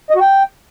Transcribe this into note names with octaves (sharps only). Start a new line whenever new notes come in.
D#5
F#4
G5